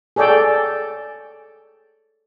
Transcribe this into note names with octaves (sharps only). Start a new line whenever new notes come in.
G#4 A4 C#5 D5 G5